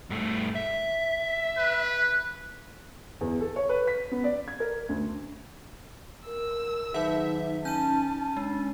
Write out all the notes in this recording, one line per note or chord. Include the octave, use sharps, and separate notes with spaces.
G2 A3
E5
B4
E2
A4
C#5
B4
B6
B3
D5
G#6
A#4
D2
A#4 E6
D#3 F#3 D#4 E5
C#4 A5 G6 D#7
G#3 D4